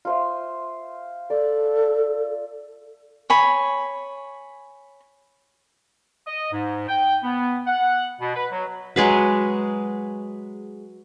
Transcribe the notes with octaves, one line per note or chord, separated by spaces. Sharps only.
F4 C5 E5
A4 D5
C#5 G#5 B5
D#5
G#2
G5
B3
F#5
B2
B4
F#3
F#3 G#3 G#4 B4